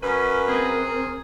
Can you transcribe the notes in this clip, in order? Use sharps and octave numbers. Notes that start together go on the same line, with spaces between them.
F#2 C#4 A#4 B4
C4 G#4